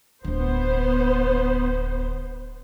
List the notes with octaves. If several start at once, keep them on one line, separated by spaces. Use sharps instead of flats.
D1 D3 B3 C5